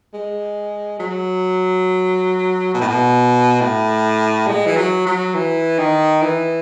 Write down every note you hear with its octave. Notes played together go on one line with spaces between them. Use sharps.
G#3
F#3
B2
A2
B2
A2
G#3
E3
F#3
F#3
E3
D#3
E3